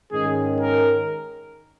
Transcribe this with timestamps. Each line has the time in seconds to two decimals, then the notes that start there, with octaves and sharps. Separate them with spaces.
0.12 G#2 D#3 G#3 C#4 G#4
0.60 A#4